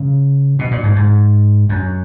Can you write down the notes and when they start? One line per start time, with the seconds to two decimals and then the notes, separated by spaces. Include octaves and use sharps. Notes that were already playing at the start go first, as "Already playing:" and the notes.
Already playing: C#3
0.59 B2
0.71 A#2
0.83 G#2
0.96 G#2
1.69 F#2